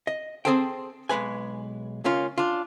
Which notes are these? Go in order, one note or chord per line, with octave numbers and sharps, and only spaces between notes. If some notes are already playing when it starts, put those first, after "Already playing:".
D#5
C4 D#4 G#4 A4 C5 G5
B1 A#2 G#3 B4 G#5
C#2 A#3 C#4 F4
D4 F4